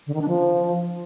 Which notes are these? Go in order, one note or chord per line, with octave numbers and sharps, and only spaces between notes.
D3
D#3
D4
F3